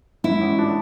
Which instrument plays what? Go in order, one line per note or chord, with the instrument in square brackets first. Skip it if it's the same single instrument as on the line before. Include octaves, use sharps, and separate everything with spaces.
[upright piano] G#2 [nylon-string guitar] E4
[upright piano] A1
D4